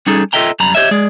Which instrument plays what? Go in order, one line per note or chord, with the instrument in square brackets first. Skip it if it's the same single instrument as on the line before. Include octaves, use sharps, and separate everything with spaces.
[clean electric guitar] G3 C#4 D#4 G#4 A4
F4 A4 D#5 E5 G5 A#5
F#2 G3 A#5 B5
G4 G#4 C#5 D#5 E5
G#3 G#4 D5